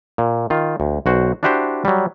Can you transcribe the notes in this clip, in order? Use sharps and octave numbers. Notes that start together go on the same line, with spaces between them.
A#2
D#3 F4
D2
B1 F#4 C5
D4 E4 F#4 G4 C5
F#3 G3